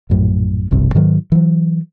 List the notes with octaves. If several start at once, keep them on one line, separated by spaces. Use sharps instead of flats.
A#1 F#2 A2
F1 B1 G2 C3
G#2 D#3 F#3
E3 F#3